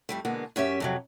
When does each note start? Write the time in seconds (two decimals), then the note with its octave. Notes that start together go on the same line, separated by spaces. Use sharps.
0.09 F2 G3 A3
0.25 B2 D3 G#3 A#3 B3
0.56 F#2 C#4 G4 E5
0.80 F2 C3 F#3